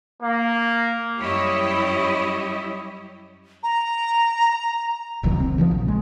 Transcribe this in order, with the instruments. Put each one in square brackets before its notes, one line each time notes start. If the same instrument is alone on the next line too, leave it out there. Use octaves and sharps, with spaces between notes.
[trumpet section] A#3
[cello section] F#2 G3 E4 G4 C#5 D#5
[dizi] A#5
[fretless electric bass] E1 C2 F#2 D#3
C4
C#3 E3 F3
A#1
G#3